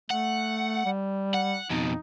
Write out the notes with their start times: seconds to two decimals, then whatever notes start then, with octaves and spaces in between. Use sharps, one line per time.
0.10 A3 F#5
0.85 G3
1.34 F#5
1.70 F2 B2 D#4